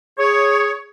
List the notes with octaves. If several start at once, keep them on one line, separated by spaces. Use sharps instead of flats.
G#4 C#5